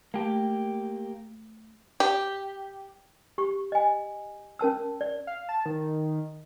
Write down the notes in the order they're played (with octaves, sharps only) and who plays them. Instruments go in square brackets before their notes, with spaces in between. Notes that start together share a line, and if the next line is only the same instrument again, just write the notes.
[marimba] A3 [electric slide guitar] A#3 G4
[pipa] G4
[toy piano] G4 C#6
D#5 G#5
C#4 A#4 A5 E6
D5
[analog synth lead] F5
A5
D#3